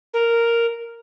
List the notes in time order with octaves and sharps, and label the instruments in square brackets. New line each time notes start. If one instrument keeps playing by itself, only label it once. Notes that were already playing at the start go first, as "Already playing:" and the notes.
[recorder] A#4